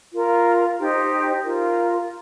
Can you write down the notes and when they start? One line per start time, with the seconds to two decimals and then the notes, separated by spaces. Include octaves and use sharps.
0.11 F4 A#4
0.78 D#4 G4 C5
1.43 F4 A#4